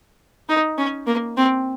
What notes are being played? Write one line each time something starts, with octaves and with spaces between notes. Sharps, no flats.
D#4
C#4
A#3
C4